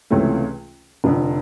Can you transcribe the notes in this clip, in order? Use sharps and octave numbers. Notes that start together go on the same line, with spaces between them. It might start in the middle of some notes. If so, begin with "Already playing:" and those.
C#2 C3 E3 A3 C#4
F1 F2 D3